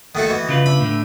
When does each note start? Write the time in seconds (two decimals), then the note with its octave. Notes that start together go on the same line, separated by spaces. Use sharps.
0.15 D#3 A3 F#4 D#5 F#5
0.30 E3 F#4 D#5
0.49 C#3 F4 B4
0.66 D4 E5 B5
0.80 A2 D3